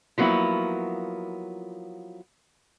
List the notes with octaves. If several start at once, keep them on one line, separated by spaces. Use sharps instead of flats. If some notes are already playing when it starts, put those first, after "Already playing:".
F3 F#3 A#3 B3 E4